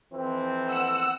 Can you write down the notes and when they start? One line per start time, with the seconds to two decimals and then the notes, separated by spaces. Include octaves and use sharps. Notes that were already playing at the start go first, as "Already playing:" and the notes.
0.13 F2 E3 C4
0.68 F#5 E6